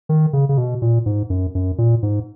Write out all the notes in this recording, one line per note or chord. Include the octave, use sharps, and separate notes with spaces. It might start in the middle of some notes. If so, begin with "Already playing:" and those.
D#3
C#3
C#3
B2
A#2
G#2
F#2
F#2
A#2
G#2